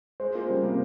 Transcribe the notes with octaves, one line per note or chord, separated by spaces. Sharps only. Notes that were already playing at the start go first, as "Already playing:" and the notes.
G#3 C5
A#3 F4
C#3 G3
C3 A#3